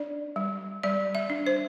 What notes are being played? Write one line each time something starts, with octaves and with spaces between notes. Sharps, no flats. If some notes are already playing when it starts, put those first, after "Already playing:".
Already playing: D4 D5
G3
G3 D5
E5
D4
C5